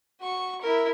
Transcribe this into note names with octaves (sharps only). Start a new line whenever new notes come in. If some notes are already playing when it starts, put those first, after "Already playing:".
F#4 C#6
E4 A#4